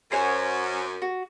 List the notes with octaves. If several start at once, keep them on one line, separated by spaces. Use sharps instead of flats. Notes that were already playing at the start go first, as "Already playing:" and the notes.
F#2 C5 C#5 G#5
F#4